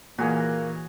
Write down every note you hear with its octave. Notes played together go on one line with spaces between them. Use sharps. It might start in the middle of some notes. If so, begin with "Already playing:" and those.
A#2 E3 A#3 F#4 G#4 C#5